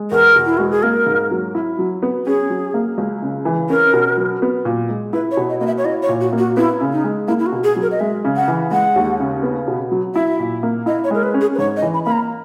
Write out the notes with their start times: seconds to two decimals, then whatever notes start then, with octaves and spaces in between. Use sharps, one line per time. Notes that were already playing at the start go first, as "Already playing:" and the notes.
Already playing: G#3
0.11 E2 A#4
0.35 B2
0.45 E4
0.58 G#3 F#4
0.71 G#4
0.83 A#3 A#4
1.06 G#2
1.31 F#3
1.55 E4
1.79 F#3
2.03 B3
2.26 C#4 G#4
2.50 F#3
2.74 A#3
2.98 C#2
3.22 C#3
3.45 E3
3.70 C#4 A#4
3.93 B2
4.18 F#3
4.42 B3
4.65 A#2
4.89 G#3
5.13 E4 B4
5.31 C#5
5.37 B2
5.49 D#5
5.60 A#3 D#5
5.66 E5
5.78 C#5
5.85 E4 D#5
6.03 C#5
6.09 A#2
6.21 F#4
6.33 A#3
6.38 F#4
6.57 B3 E4
6.81 C#3
6.93 D#4
7.04 G#3
7.28 A#3 E4
7.39 E4
7.46 F#4
7.52 B2
7.64 G#4
7.76 F#3
7.82 A#4
7.91 D#5
8.00 G#3 E5
8.24 C#3
8.36 F#5
8.48 E3
8.71 G#3 F#5
8.96 D#2
9.20 C#3
9.43 B3
9.68 B2
9.91 F#3
10.15 E4 E5
10.40 A#2
10.63 A#3
10.86 E4 D#5
11.04 C#5
11.11 G#3 A#4
11.23 B4
11.34 C#4
11.41 G#4
11.55 B4
11.58 G#2 C#5
11.77 D#5
11.82 E3
11.94 B5
12.05 A#3 B5
12.12 A#5